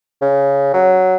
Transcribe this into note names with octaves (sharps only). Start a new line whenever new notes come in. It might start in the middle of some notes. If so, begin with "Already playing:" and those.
C#3
F#3